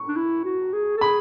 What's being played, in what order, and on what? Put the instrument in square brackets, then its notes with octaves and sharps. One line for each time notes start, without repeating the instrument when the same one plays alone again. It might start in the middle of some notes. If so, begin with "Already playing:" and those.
Already playing: [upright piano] C#6
[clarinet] D4
E4
F#4
G#4
A4
[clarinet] G#4 [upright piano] B5